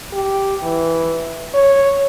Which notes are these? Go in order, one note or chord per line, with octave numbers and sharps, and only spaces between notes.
G4
E3
C#5